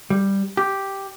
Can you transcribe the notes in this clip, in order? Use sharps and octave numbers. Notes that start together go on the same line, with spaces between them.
G3
G4